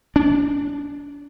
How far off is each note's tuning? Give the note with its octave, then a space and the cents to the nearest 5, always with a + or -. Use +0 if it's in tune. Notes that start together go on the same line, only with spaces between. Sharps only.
D4 -35